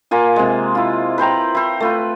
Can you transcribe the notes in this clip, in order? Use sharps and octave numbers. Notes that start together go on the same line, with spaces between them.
A#3 F4 G#5
C3 G#3
E4 F4
B4 C5 G5 A#5
E4 C5
A3 F4 B4